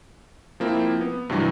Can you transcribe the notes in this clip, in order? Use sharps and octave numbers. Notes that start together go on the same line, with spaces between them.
F3 A#3 C4 E4
B3
G2 C3 E3 F#3 G3